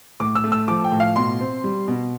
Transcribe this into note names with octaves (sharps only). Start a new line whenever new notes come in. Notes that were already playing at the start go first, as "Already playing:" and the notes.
A2 D6
E6
A3
E6
F3 D6
G5
A2
F5
B2 C6
C4
G3
B2